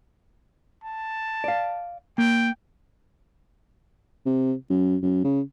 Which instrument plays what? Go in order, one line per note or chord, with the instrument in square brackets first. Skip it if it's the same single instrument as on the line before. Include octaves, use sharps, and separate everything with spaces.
[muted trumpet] A5
[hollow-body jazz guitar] D5 F5
[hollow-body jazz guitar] A#3 [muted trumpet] G5
[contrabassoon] C3
F#2
F#2
C#3